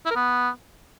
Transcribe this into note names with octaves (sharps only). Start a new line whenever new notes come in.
E4
A#4
B3